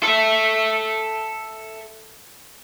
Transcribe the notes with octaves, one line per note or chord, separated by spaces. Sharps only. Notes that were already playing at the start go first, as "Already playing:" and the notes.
A4 E5